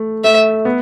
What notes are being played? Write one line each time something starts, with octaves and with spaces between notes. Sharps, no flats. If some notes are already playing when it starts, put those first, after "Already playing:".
Already playing: A3
A3 E5
B3